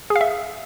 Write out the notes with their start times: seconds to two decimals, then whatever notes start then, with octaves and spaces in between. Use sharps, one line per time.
0.10 G#4
0.16 F5
0.21 E5